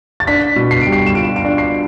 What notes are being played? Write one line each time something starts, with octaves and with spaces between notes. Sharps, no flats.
A6
D4 B6
B2
C7
G3 D7
C7
E7
F4 D7
D7
D4
C7